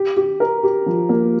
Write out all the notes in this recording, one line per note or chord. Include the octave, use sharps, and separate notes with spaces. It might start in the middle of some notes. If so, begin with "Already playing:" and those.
Already playing: G4
G4
A#4
G4
F3
A#3